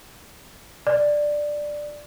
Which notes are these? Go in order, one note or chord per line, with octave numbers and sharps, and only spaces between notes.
D5